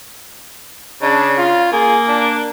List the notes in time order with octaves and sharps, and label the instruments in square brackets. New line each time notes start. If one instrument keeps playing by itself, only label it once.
[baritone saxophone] C#3 [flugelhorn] D4
[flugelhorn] F4
[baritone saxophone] A#3 [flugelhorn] G#4
[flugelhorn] D4